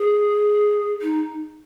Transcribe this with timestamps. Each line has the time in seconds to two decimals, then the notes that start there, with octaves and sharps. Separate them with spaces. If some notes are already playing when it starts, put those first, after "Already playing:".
Already playing: G#4
1.01 D#4